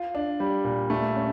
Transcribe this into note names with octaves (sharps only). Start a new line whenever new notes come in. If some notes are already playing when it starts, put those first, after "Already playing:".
Already playing: F4
D4
G3
A#2
A3
C#4